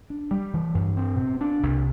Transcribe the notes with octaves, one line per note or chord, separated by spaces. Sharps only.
D4
G3
E3
G2
C4
B2
D4
C2